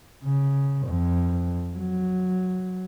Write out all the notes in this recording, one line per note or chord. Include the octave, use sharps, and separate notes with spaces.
C#3
F2
F#3